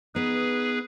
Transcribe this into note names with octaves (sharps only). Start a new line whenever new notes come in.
B3 D#4 G#4 B4